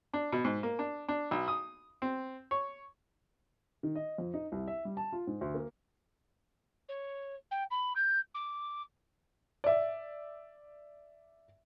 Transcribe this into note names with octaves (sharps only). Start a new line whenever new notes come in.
D4
B2
G#2
A#3
D4
D4
B1
D#6
C4
C#5
D#3
D#5
F2
D#4
C2
E5
G3
A5
F4
G#2
D2
A#3
C#5
G5
B5
G6
D6
D5 E5